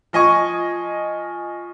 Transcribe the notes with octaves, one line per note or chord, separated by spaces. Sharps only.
F3 D#5 G#5 C#6